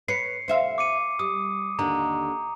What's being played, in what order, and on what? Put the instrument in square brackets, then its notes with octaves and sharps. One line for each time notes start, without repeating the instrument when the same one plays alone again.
[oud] B4 C#5 [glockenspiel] C7 C#7
[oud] C5 E5 F5
[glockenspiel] D6 C#7 D#7
[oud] G3 [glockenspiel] D#6
[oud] D#2 D3 D#3 [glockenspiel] A#5